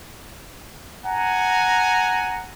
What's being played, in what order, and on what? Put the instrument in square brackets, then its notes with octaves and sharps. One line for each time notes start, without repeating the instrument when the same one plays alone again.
[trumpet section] F#5 G#5 A#5